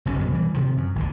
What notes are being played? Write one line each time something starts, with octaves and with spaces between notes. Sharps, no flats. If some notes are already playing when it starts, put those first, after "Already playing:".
F#1 B1 C#3 C#4
B1 F2 C#3
B2 E3 G3
C3 D#3 F3
F#2
G#1 D#2 D3